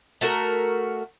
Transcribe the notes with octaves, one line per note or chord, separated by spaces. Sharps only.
A3 F#4 A#4